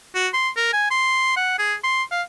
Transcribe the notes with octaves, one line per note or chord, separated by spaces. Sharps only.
F#4
C6
A#4
G#5
C6
F#5
G#4
C6
F5